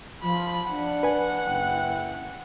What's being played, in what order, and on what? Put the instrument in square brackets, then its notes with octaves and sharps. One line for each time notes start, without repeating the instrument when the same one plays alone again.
[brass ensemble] F3 [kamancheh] B5
[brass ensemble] D4 [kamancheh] F#5
[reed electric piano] B4 G#5
[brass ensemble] F#1 E4 G5